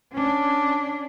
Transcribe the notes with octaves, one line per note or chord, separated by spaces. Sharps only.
C#4 D4